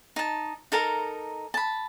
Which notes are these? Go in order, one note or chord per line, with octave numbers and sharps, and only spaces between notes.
D#4 A5
D#4 A4 A#4 A#5
A5 B5